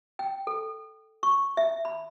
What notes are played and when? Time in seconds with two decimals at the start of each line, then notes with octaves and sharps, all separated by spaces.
0.19 G5
0.47 A4
1.23 C#6
1.57 E5
1.85 B5